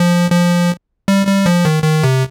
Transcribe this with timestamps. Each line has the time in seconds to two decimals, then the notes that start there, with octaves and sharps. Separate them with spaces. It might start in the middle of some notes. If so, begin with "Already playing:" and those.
Already playing: F3
0.31 F3
1.08 G3
1.27 G3
1.46 F3
1.65 D#3
1.83 D#3
2.04 C3